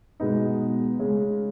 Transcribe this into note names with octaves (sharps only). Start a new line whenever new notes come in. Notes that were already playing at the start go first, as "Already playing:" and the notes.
B2 G#3 B3 D#4
C#3 G#3 C#4 G#4